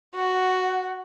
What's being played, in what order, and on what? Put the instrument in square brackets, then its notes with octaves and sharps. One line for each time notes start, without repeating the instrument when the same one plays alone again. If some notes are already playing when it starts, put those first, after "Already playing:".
[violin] F#4 [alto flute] F#5